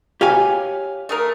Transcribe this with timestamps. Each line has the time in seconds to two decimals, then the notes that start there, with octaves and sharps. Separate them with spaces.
0.21 G4 C#5 F5 G#5
1.09 A3 G#4 A#4